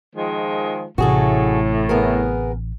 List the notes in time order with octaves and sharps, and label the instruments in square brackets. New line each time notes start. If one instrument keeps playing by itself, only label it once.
[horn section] D#3 F3 G#3
[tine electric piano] A1 [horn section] A2 [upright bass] C3 [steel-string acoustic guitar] F#4 G#4 A4
[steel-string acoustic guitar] B3 G#4 A#4